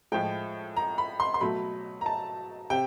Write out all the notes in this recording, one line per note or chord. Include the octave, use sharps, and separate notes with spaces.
A2 F3 G#3 G5
A#5
B5
C6
C6
B2 F#3 A3 B5
A#5
A5
C3 G5